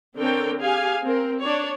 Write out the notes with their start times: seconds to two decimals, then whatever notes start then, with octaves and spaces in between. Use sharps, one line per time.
0.17 D3 C4 A4 A#4 C#5 G5
0.59 G4 G#4 F5 G#5
1.04 C4 A#4
1.40 D4 C#5